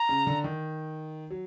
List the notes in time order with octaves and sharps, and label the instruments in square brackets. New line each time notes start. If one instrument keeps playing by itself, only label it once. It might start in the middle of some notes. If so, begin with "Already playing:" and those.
Already playing: [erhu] A#5
[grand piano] C#3
D3
D#3
F#3